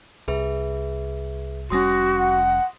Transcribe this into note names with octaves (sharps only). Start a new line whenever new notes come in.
C2 G#4 B4 E5
F1 G3 C#4 F#4 C6 D#6 A#6
F#5